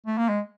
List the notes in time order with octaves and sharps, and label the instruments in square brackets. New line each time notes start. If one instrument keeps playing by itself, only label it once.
[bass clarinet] A3
A#3
G#3